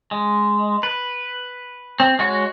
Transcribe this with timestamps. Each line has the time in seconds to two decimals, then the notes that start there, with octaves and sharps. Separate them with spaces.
0.11 G#3
0.83 B4
2.00 C4
2.19 G#3 F#4 C#5